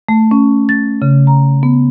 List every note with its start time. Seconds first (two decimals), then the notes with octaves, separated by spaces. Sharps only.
0.09 A3
0.31 C#4
0.69 A6
1.02 C#3
1.27 A#5
1.63 B3